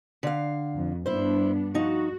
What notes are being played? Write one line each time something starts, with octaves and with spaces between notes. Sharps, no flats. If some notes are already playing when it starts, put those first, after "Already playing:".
D3 F5
F2
G2 B3 D4 E4 C5
F3 D#4 F#4